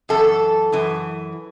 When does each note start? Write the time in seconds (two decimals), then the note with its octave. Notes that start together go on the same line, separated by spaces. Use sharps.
0.09 F#2 E3 A4
0.72 F#2 E3